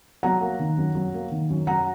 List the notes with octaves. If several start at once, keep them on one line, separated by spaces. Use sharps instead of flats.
F#3 F#5 A#5
A#3
D#3
F#2
F#3
A#3
D#3
F#2
F#3 F#5 A#5